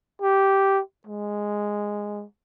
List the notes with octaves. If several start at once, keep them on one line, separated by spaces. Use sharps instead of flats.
G4
G#3